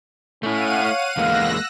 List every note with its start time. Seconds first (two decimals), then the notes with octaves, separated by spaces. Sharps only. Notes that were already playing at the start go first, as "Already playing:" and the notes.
0.43 A3 C#4 E4 F5 F#5 D#7
0.83 C#5
1.17 E2 G#3 A#3 F5 E6 F#6 A#6